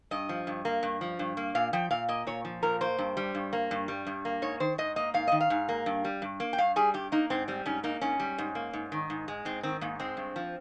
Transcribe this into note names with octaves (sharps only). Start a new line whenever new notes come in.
G2 D#5
F3
G2
A#3
G2
F3
G2
A#3
A#2 F5
F3 G5
A#2 F5
A#3 D#5
A#2 C#5
F3
A#2 A#4
A#3 C5
G2
G3
G2
A#3
G2
G3
G2
A#3
G#2 C#5
D#3 C5
G#2 D#5
A#3 D#5
G#2 F5
D#3 D#5
F5
G#2
A#3
G2
G3
G2
A#3
G5
G2 F5
G3 G#4
G2 G4
A#3 D#4
G#2 C4
G3 C4
G#2 C#4
A#3 D#4
G#2 C#4
G3
G#2
A#3
G#2
D#3
G#2
G#3
G#2 C4
D#3 C4
G#2 A#3
G#3 C4
G2
F3